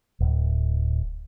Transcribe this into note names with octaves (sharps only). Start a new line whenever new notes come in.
D1